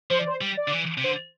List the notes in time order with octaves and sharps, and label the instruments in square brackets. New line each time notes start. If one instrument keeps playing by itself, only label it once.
[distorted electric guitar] F3 [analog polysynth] C5
[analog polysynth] D5
C5
[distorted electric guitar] G3
[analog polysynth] D5
[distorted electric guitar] D3
E3
C3
[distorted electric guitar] D3 [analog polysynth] C5